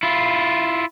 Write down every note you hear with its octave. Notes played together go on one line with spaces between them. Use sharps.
E4 F4